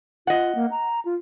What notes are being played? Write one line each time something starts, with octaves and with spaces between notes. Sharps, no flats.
F4 D#5 F#5
A#3
A#5
F4